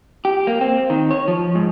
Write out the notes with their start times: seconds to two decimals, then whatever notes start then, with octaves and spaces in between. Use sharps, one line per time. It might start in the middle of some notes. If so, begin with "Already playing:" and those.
0.25 G4
0.47 A#3
0.61 C4
0.90 D#3
1.11 C#5
1.28 F3
1.55 G#2